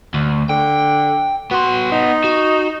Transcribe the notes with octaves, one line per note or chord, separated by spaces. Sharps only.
D2
D3 G5
B3 F#4 C6
D#4
F#4